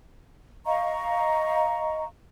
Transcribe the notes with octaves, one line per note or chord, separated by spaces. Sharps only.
D#5 F5 A#5 C#6